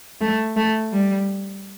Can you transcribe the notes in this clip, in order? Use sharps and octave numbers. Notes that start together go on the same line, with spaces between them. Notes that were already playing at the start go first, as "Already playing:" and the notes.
A3
A3
G3